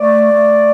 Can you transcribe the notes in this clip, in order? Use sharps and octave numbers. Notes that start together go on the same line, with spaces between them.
A3 D5
A3